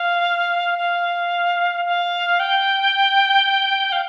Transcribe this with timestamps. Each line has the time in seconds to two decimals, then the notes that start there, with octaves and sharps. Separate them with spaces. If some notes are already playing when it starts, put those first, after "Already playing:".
Already playing: F5
0.79 F5
1.85 F5
2.40 G5
3.92 F5